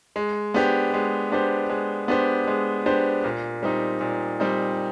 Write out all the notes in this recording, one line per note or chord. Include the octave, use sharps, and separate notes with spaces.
G#3
B3 D4 G4 C5
G#3
B3 D4 G4 C5
G#3
B3 D4 G4 C5
G#3
B3 D4 G4 C5
A#2
G3 C4 D#4
A#2
G3 C4 D#4